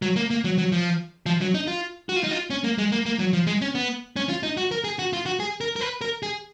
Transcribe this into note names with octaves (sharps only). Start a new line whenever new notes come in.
F#3
A#3
A#3
F#3
F#3
F3
F3
F#3
D#4
F4
F#4
F4
D#4
F4
C#4
A#3
G#3
A#3
A#3
F#3
F3
G#3
C#4
B3
C#4
F4
D#4
F#4
A#4
G#4
F#4
F4
F#4
G#4
A#4
A#4
B4
A#4
G#4